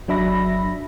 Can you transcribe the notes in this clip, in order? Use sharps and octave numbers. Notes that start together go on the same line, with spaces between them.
G1 F#3 D4 E5 B5 A#6